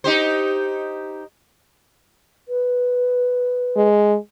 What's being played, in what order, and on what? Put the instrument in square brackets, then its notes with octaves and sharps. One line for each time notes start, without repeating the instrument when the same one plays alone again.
[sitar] D#4 G4 C5
[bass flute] B4
[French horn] G#3